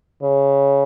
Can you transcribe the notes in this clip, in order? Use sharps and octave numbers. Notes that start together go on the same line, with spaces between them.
C#3